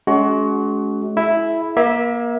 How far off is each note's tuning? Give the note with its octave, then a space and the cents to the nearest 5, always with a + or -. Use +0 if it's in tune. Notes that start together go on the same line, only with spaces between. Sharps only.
G#3 +45 C#4 +35 F#4 +20
E4 +0 G#4 +40 E5 +0
A#3 +30 E5 -10